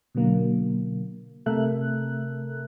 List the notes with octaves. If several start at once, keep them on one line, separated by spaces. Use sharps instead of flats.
B2 D3 F#3 A#3
C3 A3 A4 A#4 E5 F#6